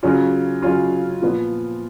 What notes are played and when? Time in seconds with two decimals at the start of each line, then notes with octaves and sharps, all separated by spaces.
0.03 C#3 F#3 C#4 F4
0.63 C#3 F#3 C#4 F4
1.22 A#2 F3 B3 F4 B4